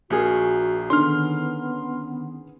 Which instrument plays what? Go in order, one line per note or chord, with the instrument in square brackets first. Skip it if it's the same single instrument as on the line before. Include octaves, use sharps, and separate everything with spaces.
[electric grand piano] A#1 [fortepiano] A#3 G#4 [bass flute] F#4
[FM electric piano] D3 D#3 C#4 [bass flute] B3 [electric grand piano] C6 F6